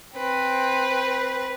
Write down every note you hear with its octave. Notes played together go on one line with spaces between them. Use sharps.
C4 B4